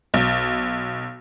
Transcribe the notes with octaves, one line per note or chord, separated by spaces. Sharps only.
B1